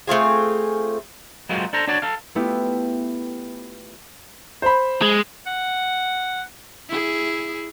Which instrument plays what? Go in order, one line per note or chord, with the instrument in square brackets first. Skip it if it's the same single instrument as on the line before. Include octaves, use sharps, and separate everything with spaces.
[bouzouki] A3 C4 F4 G#4
[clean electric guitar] F#3 G#3 A#3 C4 F4 F#4
D4 A4 C5 A#5
D4 F#4 C#5 D5
A4 F5
[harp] A3 B3 E4 F4 G4
[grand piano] C5 B5
[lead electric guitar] G#3
[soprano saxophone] F#5
[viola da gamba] E4 G#4